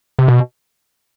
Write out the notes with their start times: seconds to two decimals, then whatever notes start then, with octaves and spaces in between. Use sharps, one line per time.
0.19 C3
0.28 B2